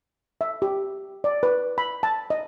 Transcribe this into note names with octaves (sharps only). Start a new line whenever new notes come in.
E5
G4
D5
B4
B5
A5
D#5